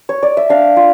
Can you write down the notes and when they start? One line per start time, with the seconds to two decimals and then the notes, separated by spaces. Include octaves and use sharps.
0.09 C#5
0.23 D5
0.37 E5
0.49 D4 F5
0.77 F4